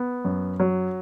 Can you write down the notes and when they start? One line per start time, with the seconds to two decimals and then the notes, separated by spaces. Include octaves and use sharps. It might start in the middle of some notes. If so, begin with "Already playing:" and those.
Already playing: B3
0.25 F#2
0.60 F#3